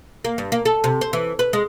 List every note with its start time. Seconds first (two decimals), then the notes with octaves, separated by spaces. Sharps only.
0.24 A#3
0.38 G2
0.52 A#3
0.65 A4
0.84 C3
1.01 C5
1.13 E3
1.39 B4
1.53 G#3